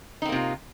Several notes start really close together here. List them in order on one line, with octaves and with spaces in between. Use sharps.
D#4 C4 A#3 C3 F4